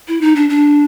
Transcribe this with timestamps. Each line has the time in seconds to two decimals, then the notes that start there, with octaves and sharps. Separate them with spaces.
0.08 E4
0.21 D#4
0.36 D4
0.49 D4